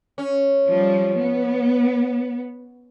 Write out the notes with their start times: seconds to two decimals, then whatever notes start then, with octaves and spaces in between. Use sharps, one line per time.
0.18 C#4
0.68 F3 G3
1.19 B3